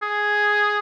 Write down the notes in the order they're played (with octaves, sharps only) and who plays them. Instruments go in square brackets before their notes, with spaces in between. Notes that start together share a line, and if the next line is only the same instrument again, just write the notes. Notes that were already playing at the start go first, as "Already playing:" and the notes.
[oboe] G#4